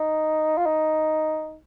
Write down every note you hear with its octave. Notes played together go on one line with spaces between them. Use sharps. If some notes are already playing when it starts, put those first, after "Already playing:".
Already playing: D#4
F4
D#4